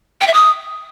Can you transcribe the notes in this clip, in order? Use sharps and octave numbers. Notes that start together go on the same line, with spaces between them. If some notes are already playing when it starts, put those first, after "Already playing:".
G5
E5
D#6